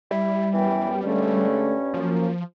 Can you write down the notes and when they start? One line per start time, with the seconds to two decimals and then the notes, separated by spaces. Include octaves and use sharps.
0.11 G3 E4
0.53 F#2 E3 B3 G5
1.03 G2 D3 G#3 A3 C#4
1.94 F3 F#3 A#3